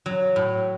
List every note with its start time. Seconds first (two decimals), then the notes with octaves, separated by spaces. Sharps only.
0.06 F#3
0.36 A2